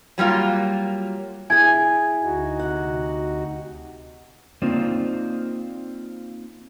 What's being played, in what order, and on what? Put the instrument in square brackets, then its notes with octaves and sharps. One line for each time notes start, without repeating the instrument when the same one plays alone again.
[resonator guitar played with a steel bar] F#3 G3 A#3 F4
[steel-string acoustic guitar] E4 G#4 [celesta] G#5 G#6
[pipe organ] D2 D#4 F#4
[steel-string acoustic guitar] C3 F#5
[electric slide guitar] A#3 C4 D#4 F4 C5 D5